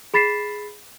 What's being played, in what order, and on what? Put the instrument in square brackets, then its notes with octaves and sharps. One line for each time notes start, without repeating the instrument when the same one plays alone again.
[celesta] G#4 B5 A6 B6 C7 E7